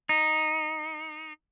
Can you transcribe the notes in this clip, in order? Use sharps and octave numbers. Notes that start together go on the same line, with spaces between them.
D#4